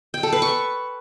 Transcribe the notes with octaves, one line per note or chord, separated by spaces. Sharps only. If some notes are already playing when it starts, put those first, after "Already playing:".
G5
A4
B4
C#6